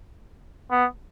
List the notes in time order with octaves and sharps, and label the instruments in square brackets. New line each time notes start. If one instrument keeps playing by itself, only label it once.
[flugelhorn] B3